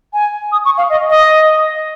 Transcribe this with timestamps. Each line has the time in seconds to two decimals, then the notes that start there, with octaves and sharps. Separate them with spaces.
0.13 G#5
0.52 D#6
0.65 C#6
0.78 F5
0.90 D#5
1.10 D#5